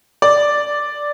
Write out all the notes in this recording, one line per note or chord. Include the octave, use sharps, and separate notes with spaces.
D5